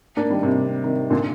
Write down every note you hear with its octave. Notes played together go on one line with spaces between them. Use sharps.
A#3 D4
D#3 G3
C3
C3 D#3
A#2 D3